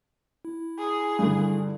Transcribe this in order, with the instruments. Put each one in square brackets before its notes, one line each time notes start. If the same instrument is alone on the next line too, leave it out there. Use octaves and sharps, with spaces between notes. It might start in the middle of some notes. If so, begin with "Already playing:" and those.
[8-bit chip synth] E4
[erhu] G#4
[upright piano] G2 D3